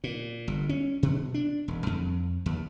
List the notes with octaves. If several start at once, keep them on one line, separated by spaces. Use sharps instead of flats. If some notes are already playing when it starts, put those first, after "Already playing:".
A#2
G1
C#4
B2
D4
E1
F2
D#2